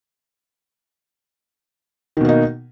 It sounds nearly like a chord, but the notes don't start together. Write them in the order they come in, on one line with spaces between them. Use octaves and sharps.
D#3 B2 A#3 D#4